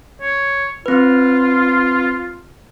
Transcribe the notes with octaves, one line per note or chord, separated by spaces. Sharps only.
C#5
C4 F4 B4